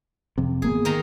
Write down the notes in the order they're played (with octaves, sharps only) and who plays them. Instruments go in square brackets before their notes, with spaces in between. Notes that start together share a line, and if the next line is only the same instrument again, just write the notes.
[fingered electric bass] F2 C3
[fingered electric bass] G#1 A#3 B3 [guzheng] G#4
[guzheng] D#3 D#4 A#5